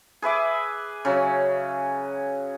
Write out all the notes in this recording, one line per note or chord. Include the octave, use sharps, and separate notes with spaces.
G#4 B4 E5 D6
C#3 F#3